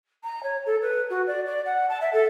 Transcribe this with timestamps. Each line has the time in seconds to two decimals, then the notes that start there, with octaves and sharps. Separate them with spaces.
0.24 A#5
0.43 C#5
0.66 A4
0.82 B4
1.10 F#4
1.27 D5
1.46 D5
1.66 F#5
1.89 A5
2.01 E5
2.13 A4